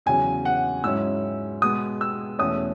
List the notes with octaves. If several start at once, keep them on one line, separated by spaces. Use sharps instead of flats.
E2 C#3 F#3 G#5
F#5
G#2 F#3 C#4 E4 E6
B2 G#3 B3 D#6
E6
E2 B2 A3 C#4 D#6